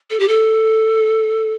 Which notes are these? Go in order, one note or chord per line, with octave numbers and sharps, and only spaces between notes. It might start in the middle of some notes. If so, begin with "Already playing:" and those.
A4
G4
A4